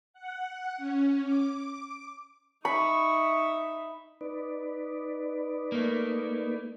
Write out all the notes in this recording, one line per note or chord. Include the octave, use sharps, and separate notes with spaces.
F#5
C#4
D6
D#4 E5 B5 C#6
D#4 B4 D5
A3 A#3